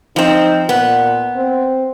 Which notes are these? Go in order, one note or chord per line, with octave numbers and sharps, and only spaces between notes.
F3 C4 D#4
A#2 B3
C4